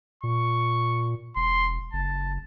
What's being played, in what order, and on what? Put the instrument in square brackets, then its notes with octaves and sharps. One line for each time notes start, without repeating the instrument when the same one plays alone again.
[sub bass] A#2 [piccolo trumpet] C#6
[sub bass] E1 [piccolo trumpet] C6
[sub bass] F#1 [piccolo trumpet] A5